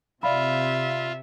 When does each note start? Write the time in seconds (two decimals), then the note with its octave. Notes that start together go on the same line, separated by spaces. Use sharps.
0.23 C3 F4 D5 E5 F5 B5